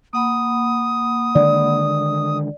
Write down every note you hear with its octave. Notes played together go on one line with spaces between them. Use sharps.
A#3 F#5 B5 D#6
D3 D#3 G#3 D5